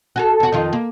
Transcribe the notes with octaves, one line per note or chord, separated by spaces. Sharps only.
F#4 G#4 A4
E2 F#4
F2 D#3 F4
A#3